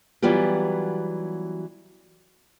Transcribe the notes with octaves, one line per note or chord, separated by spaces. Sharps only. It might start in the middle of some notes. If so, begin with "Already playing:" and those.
E3 F#3 G3 B3 F4 G4